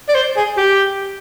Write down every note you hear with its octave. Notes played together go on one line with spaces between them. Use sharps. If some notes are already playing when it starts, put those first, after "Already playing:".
D5
C5
G#4
G4